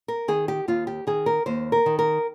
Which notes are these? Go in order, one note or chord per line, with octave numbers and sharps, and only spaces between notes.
A#4
D#3 G#4
G4
D#2 F4
G4
D#3 G#4
A#4
D#2 C5
A#4
D#3
A#4